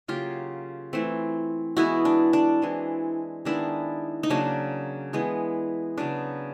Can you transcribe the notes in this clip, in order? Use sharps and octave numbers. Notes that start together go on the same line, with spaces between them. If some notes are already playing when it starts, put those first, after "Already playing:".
C#3 F#3 A#3 F4 G4
E3 A3 C4
E3 G#3 B3 E4 F#4
D4
D4
E3 G#3 C4
D#3 G#3 B3 D4 E4
D#4
C#3 F#3 A#3 D4
E3 G#3 B3
C#3 F#3 B3 D4